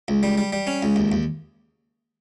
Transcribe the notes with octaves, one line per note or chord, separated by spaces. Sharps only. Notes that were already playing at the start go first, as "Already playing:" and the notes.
C#2
G3
G3
G3
C#4
C#2
D#2
D#2